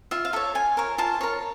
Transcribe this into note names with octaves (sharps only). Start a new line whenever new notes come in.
F4 E5
F5
A4 C#5 E5
F4 G#5
A#4 C#5
F4 A5
A#4 C#5